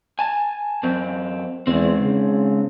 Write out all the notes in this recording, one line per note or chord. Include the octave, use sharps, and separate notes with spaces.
G#5 A5
F#2 C4
E2 G#3 C4
C#3